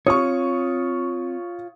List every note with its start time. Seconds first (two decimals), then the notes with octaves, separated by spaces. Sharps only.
0.07 C4 F4 C#5 C#6 D#6